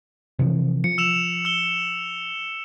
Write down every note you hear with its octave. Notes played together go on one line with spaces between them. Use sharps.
C3 E3 F3
F3 C#7
E6 E7 F7
E6 G7